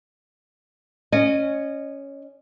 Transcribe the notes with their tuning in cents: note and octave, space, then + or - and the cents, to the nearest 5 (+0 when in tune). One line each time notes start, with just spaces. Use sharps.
C#4 +0 D#5 -25